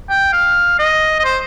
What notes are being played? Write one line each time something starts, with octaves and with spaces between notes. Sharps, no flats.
G5
F5
D#5
D#5
C5